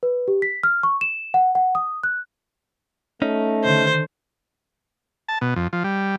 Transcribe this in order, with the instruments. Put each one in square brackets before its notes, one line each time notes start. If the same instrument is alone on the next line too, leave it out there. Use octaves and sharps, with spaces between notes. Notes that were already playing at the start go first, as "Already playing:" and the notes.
[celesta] B4
G4
B6
F6
C#6
E7
F#5
F#5
D#6
F#6
[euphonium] A3 [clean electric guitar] C#4 D#4
[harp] D3 D#3 [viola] C5
[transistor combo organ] A5
B2
F2
F3
G3